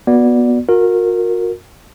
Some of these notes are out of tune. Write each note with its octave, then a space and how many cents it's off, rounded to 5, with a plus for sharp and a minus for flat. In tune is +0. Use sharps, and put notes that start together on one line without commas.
B3 -20 F#4 -15 D5 +0
F#4 -40 A#4 -10